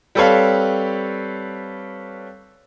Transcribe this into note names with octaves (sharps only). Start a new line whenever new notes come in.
G3 C4 A4 B4 C#5 F5